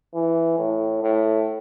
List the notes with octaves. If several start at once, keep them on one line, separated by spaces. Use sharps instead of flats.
E3
A2
A2